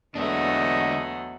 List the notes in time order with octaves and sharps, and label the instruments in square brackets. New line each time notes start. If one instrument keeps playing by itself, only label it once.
[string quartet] E2 F#3 A3 [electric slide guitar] D3 G#3 D4 [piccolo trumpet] D#5